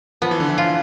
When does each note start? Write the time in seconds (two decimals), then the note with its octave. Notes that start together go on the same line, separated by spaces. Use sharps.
0.22 F3 B3
0.31 E3
0.40 D3
0.49 E3
0.58 F4